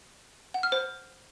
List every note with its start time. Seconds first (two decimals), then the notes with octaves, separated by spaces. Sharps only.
0.54 F#5
0.63 F6
0.72 C5